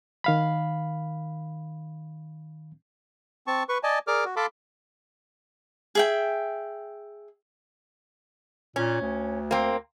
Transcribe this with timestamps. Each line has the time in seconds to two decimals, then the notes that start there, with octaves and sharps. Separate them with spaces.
0.24 D#3 F5 B5
3.47 C4 A5 C#6
3.69 B4 C#6
3.83 D5 D#5 G#5 A5
4.07 G#4 A#4 D5 D6 F6
4.24 F#4
4.36 A4 F5 A5 B5 C6 D6
5.95 G#4 E5 G5
8.76 A#2 C#4
9.02 D2
9.51 A#3 C4